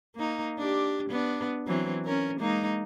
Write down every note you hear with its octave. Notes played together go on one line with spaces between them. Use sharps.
A#3 D#4
D4 G4
B3 D4
E3 F#3 C4
C#4 A#4
G#3 A#3 D#4